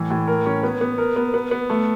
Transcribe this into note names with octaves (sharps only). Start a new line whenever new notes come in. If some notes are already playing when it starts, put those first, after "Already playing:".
Already playing: A2 E3
A2
A#4
C#4
B3
B3
A#4
B3
B3
B3
A3